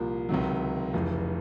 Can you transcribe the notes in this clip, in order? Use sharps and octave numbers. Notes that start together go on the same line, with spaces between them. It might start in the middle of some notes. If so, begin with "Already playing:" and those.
Already playing: C2 A#2 F3 A#3
C#2 C3 D#3 F#3
F1 F2 C#3 E3